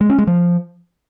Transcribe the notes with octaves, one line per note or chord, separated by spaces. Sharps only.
G#3
C#4
G#3
F3